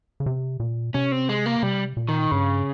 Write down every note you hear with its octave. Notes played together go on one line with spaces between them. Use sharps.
C#3
C3
A#2
C3 C#4
C4
G#3
A#3
C3 G3
A#2
D#3
G2 C#3